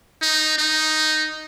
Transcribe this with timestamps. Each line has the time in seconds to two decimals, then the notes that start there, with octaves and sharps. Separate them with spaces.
0.22 D#4
0.58 D#4